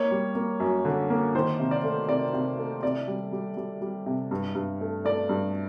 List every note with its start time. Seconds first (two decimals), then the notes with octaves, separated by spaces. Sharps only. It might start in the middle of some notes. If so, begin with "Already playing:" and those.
Already playing: A#3 C#5
0.11 G3
0.35 A#3
0.60 F#2
0.85 D3
1.10 A#3
1.35 D#3 C5
1.59 C3
1.71 D5
1.83 A3
2.08 C3 D5
2.33 C3
2.58 A3
2.82 C3 D5
3.08 G3
3.32 G3
3.57 G3
3.81 G3
4.06 C3
4.31 G2
4.55 G2
4.81 A3
5.05 A3 D5
5.29 G2